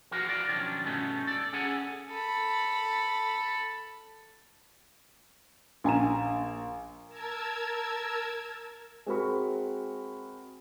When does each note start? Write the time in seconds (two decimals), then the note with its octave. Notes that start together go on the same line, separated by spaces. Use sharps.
0.11 F3 F#4 A#4 C5
0.28 A#4 B4 D5 F5
0.48 B1 D#3 F3 C#4 D4
0.85 G2 B2 A3 B3 C#4 D#4
1.27 A4 D5
1.53 C#4 G#4 A4 F#5 G#5
2.11 A4 B5
5.84 A#1 G#5 A#5 E7
7.07 A#4 A5 E6 G#6
9.06 G#3 C4 F#4 A#4 B5 C#6